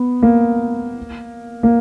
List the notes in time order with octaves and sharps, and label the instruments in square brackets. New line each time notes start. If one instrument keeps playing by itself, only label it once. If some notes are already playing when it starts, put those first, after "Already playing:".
Already playing: [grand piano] B3
A#3
A#3